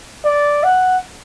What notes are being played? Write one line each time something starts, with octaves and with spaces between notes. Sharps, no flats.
D5
F#5